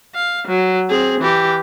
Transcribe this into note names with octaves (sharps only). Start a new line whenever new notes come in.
F5
F#3
C4 G#4
E3 G4